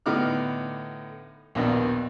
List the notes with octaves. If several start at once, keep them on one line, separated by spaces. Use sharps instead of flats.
A2 D3 B3 D#4 D6 F6
A#1 D#2 B2 B3 D4 D#5